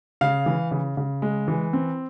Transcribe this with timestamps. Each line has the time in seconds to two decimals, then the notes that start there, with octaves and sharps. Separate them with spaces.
0.21 C#3 F5
0.46 E3
0.71 C#3
0.97 C#3
1.22 G#3
1.48 E3
1.73 C4